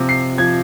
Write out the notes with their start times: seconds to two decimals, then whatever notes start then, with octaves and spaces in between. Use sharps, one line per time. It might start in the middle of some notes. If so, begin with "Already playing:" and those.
Already playing: C3 F3
0.09 C7
0.38 F3 G#6